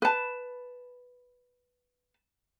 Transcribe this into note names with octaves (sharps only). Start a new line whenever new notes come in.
B4 A5